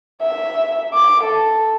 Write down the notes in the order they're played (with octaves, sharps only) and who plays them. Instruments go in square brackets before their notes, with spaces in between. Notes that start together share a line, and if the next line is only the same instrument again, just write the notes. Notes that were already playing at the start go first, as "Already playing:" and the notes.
[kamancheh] E5
D6
A4